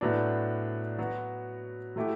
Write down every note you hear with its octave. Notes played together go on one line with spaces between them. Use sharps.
A2 F#3 B3 D4
F#3 B3 F#4
F#3 A3 E4 G4